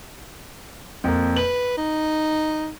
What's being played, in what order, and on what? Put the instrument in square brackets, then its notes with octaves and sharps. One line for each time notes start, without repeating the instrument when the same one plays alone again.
[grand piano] F2 A#3
[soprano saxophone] B4 [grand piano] F#7
[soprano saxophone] D#4